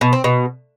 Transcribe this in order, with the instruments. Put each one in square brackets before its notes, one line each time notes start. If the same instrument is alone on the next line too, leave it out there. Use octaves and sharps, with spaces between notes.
[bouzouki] B2
C4
B2